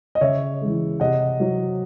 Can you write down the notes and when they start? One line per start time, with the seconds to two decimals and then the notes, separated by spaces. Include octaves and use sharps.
0.15 D#5
0.21 C#3 C#5 E5
0.61 E3 G#3
1.00 C3 D#5 F#5
1.40 F#3